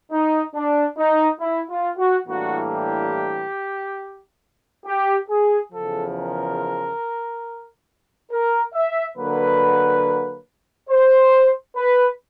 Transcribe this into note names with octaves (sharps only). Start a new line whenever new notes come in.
D#4
D4
D#4
E4
F4
F#4
A2 E3 G3 A#3 D4 F#4
G4
G4
G#4
E2 C#3 F3 A4
A#4
A#4
E5
D3 F#3 A#3 B4
C5
B4